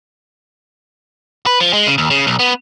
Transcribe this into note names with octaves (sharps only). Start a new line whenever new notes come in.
B4
F3
G#3
C#3
D#2
C#3
B1
B3